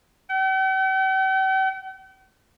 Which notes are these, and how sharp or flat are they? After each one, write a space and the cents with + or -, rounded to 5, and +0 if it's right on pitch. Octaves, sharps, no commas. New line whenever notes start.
G5 -45